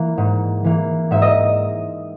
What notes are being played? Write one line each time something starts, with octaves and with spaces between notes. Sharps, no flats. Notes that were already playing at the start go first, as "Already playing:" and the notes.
Already playing: E3 A#3
G#2
E3 A#3
G#2 E5
D#5